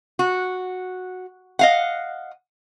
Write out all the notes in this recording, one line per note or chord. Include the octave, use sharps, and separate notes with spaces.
F#4
D#5 F5 F#5